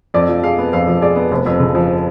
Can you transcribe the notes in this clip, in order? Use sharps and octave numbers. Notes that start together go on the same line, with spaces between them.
F2 D5
F3
G#3 F5
B3
F2 F5
F3
G#3 D5
B3
F1
F2
C#3
F3